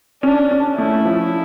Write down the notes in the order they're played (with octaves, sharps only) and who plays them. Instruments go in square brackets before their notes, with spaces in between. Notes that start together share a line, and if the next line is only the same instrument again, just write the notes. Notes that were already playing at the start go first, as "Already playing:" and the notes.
[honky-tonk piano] C#4 [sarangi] D4
[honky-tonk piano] C#4
[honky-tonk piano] A3 [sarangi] E4
[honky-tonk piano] F3